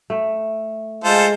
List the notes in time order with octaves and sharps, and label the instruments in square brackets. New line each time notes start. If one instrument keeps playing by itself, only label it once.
[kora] A3
[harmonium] G#3 [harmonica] F4 A4 C5